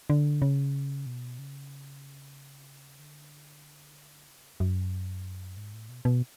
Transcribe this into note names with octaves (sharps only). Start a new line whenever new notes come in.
D3
C#3
B2
C#3
D3
C#3
F2
F#2
G#2
A2
B2
B2